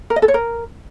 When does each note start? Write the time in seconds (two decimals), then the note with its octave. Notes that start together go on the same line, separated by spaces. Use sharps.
0.10 A#4
0.16 D#5
0.22 A4
0.28 C#5
0.34 A#4